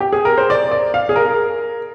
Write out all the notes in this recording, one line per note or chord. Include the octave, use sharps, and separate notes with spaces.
G4
G#4
A#4
C5
D5
D5
F5
G#4
A#4